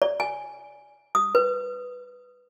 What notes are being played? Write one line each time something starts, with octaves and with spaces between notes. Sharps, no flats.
D5
G#5
D#6
B4